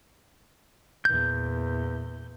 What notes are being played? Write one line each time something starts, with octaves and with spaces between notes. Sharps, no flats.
E2 A#2 G6